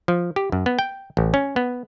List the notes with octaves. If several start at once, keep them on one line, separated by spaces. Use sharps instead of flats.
F3
G4
F#2
B3
G5
A1
C#4
B3